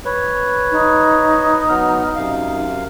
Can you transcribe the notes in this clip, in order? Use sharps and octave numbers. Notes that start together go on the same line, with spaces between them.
B4 C#5
D#4
F#3 B3 F6
F#2 C3 F5